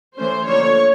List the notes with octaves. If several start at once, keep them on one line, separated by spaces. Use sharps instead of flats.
E3 A3 C#4 C5
D3 F3 A#3 C#5